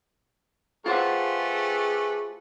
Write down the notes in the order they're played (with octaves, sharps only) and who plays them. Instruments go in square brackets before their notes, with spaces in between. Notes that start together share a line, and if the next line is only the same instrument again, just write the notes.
[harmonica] A3 G4 B4 [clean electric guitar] F4 C5 F#5 [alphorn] G#4